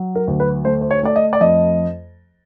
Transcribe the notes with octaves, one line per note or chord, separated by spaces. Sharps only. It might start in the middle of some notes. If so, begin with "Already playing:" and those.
Already playing: F#3
A#4
D2
B4
A3 C5
C5
C#5
A3 D5
D#5
D5
F2 D#5